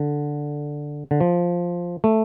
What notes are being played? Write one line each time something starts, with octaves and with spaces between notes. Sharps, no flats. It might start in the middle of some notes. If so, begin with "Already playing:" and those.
Already playing: D3
D3
F3
A3